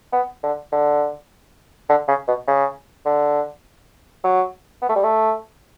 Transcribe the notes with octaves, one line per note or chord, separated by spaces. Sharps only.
B3
D3
D3
D3
C#3
B2
C#3
D3
F#3
B3
A3
G3
A3